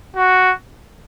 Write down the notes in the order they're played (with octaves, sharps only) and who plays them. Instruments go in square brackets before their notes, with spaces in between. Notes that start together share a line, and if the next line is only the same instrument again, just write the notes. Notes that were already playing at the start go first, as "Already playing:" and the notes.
[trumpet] F#4